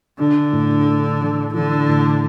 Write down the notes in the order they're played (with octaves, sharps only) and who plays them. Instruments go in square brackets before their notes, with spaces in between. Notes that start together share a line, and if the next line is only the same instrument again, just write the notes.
[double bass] D3 [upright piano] D4
[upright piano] A2
A3
E3
[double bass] D3 [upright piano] E3
[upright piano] A2